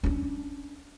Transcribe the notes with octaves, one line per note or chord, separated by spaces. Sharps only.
C#4 D4